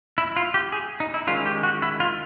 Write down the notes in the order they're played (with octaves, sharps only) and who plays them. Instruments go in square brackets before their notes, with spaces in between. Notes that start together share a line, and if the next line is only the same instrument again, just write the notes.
[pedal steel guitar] E4
F4
G4
G#4
D#4
E4
D#3 G#3 C#4 F4
G4
F#4
E4
F4